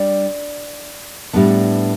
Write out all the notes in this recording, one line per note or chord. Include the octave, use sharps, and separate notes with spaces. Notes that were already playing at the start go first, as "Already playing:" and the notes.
Already playing: G3 D4 D5
A2 G3 B3 D4